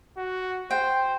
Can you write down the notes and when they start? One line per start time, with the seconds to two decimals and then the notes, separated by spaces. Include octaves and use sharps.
0.17 F#4
0.71 C5 G5